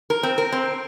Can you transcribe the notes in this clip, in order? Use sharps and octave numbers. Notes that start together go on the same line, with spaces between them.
A#4
C4
A#4
C4